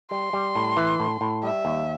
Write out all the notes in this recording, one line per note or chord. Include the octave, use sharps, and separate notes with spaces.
G3 C6
G3
A2
E3
A2
A2
G3 E5
D#2